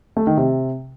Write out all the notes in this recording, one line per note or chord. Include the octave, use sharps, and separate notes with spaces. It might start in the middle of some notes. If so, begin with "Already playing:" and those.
A3
D#3
C3